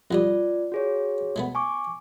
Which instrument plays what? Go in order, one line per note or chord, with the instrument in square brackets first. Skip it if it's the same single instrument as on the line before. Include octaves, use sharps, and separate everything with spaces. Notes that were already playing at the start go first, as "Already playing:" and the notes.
[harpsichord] F2 G3 D#5 [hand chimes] F4 D5
[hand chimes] F#4 G#4 C#5
[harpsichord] G#3 A3 B3
[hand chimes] G#5 C#6 D6